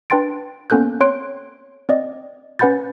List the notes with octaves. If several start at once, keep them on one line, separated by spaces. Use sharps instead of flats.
D4 B4 G5 C6 A6 D7
A#3 B3 C#4 A4 F#6 G6
C4 C#5 C6 F#6 D7
C4 D5 D#5
C#4 B4 F#5 B5 G6 A6